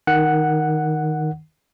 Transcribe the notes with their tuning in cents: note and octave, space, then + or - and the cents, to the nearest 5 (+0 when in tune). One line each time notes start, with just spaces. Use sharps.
D#3 +0 F#5 +0